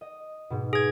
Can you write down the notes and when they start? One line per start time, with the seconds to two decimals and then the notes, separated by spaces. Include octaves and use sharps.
0.01 D#5
0.50 G#2 B2
0.73 G#4 G#6